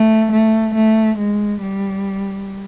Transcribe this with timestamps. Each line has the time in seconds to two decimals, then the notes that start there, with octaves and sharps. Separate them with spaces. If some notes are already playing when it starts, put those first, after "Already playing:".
Already playing: A3
0.32 A3
0.75 A3
1.18 G#3
1.61 G3